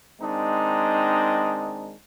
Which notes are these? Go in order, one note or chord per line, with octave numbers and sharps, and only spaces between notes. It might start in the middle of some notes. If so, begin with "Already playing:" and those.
D#3 G#3 C4 D4 D#4